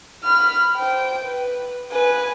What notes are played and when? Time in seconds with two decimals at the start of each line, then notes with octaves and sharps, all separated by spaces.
0.24 B5 F6
0.76 C5 G5
1.24 B4
1.91 B4 G#5